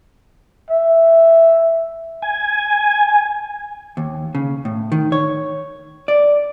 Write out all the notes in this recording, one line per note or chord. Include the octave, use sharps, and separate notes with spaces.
E5
G#5
D#2
C#3
A2
D#3
C#5
D5